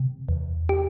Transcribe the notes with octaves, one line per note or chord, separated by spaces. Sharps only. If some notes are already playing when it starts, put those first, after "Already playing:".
Already playing: C3
E2
G4